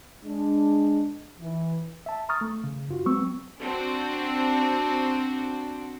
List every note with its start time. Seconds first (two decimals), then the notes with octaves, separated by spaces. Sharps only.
0.24 G#3 D4
1.40 E3
2.06 E5 A5
2.29 A#5 C#6 D#6 F6 A6
2.41 A3
2.64 C#3
2.89 F#2 F4 F#4
3.06 F#3 G#3 B3 C4 C#6 E6
3.61 C4 D4 F#4